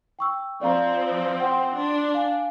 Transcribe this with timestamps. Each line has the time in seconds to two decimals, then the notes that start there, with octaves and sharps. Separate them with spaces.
0.19 G5 C#6 E6
0.61 F3 C4 D5 F5 A#5
1.40 F#5 G5 C6
1.78 D4 C6
2.14 F5 G#5